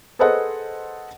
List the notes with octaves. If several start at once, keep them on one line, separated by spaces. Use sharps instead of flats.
G#4 A4 B4 C5 D#5 F#5